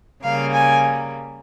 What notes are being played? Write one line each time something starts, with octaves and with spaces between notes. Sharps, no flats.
C#3 G3 A#3 F5
G#5